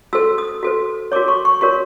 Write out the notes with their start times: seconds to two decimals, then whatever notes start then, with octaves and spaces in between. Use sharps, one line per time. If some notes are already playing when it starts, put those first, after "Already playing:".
0.13 F#4 A4 C5 E6
0.38 D#6
0.63 F#4 A4 C5
1.12 F#4 A#4 C#5 D6
1.28 C#6
1.45 C#6
1.61 F#4 A#4 C#5 C#6